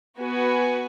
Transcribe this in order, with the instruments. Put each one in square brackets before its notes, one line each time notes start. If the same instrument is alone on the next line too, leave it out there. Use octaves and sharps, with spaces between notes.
[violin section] B3 F#4 B4 G#5